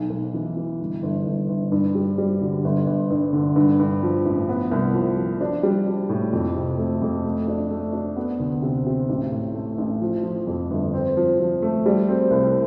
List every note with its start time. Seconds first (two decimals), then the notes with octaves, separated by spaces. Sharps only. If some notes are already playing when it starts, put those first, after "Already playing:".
Already playing: B1
0.10 B1
0.34 E3
0.57 E3
0.80 G1
1.03 G1
1.26 G1
1.49 G1
1.72 G2
1.95 G3
2.18 G3
2.41 D3
2.64 G1
2.87 G1
3.10 G2
3.33 D3
3.56 G2
3.79 G2
4.03 F3
4.26 A1
4.49 B3
4.71 C2
4.94 F3
5.17 F3
5.41 D4
5.63 G3
5.87 D4
6.09 A2
6.33 F2
6.56 C3
6.78 A3
7.02 F2
7.24 A3
7.48 D4
7.71 A3
7.93 D4
8.16 B3
8.40 D2
8.62 C3
8.86 C3
9.09 A1
9.32 A2
9.54 A3
9.78 A1
10.02 F3
10.23 F3
10.47 F2
10.70 G1
10.94 C4
11.17 F3
11.40 F3
11.62 A3
11.86 G3
12.08 C4
12.31 C2